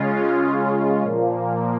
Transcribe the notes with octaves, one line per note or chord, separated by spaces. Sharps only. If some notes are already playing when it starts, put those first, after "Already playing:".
Already playing: C#3 G#3 C#4 F4
A#2 F3 A#3